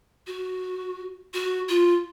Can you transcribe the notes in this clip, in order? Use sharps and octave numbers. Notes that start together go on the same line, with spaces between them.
F#4
F#4
F4